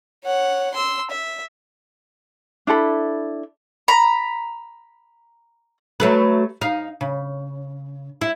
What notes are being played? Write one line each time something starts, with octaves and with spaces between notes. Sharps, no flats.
C#5 F#5
C6 E6
E5
D4 E4 A4 B5
A#5 B5
F#3 A3 B4
D#4 F5
C#3
E4